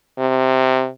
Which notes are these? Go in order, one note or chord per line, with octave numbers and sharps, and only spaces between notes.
C3